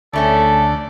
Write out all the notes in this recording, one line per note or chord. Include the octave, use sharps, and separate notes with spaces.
D2 C#3 A3 C#4 A4 D5